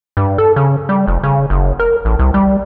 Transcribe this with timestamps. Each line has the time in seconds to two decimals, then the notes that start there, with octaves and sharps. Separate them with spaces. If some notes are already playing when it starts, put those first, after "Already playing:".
0.17 G2
0.38 A4
0.56 C#3
0.89 G3
1.07 F1
1.23 C#3
1.50 F#1
1.79 A#4
2.05 A1
2.19 C2
2.34 G3